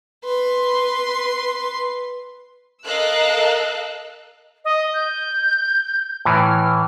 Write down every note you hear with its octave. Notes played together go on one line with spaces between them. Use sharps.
B4 C6
A4 A#4 D#5 F5 E6 F#6
D#5
G6
A2 E3 F6